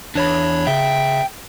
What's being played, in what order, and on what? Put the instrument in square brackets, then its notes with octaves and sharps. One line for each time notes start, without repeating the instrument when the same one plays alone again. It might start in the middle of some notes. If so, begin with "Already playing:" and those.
[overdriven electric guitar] E2 [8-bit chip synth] D4 C#5 B5
[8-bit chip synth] C#3 E5 [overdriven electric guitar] G5